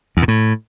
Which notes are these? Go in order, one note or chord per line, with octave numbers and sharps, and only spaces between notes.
E2
A#2
A2